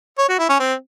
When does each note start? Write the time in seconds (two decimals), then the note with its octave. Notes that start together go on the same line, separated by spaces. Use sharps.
0.18 C#5
0.29 F#4
0.39 E4
0.49 C#4
0.60 C4